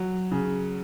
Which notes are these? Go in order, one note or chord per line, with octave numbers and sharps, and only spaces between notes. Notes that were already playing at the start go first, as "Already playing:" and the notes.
Already playing: F#3
C#3